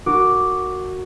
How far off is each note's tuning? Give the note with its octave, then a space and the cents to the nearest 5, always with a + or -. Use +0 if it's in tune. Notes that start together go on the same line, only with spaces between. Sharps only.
F#4 +0 A#4 -20 D6 +0